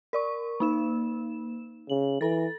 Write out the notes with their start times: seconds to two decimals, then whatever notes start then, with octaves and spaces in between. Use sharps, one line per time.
0.13 A#4 D5 C#6
0.60 A#3 D#4 E7
1.90 C#3 F#7
2.21 E3 A4 A6